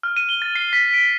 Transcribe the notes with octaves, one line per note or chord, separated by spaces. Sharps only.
F6
D#7
G7
A6
C7
B6
D7